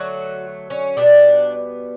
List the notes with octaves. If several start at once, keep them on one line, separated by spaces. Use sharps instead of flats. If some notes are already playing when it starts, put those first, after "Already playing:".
Already playing: D3 F#3 A3 F#4
C#4
B2 G3 B3 D4